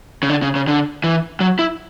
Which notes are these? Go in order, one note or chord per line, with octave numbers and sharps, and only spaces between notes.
C#3
D3
C#3
C#3
D3
E3
F#3
E4